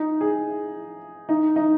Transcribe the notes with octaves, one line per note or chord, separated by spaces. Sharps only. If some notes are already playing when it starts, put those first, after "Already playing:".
Already playing: D#4
G#4
D#4
D#4